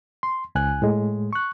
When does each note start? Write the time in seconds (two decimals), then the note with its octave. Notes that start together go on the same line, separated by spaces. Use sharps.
0.23 C6
0.55 C#2 G#5 F#6
0.82 A2 G#3
1.33 C#6 F#6